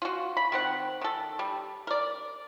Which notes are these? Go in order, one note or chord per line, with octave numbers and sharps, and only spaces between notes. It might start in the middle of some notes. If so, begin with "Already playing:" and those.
F4 F#4
B5
D#3 C4 F#5
D#3 A4
G3
A#4 D5